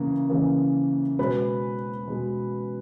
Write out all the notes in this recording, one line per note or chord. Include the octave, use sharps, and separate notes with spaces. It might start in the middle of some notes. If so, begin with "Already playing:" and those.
Already playing: C#3 E3 A#3
C#3 E3 A#3
B2 G#3 B4
B2 G#3